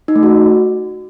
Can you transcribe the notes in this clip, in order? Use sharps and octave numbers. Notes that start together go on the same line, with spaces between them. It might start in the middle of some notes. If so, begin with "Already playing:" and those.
D#4
A3
F#4